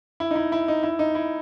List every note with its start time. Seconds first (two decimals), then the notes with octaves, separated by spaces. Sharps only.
0.20 E4
0.31 D#4
0.36 E4
0.52 E4
0.68 D#4
0.83 E4
0.99 D#4
1.15 E4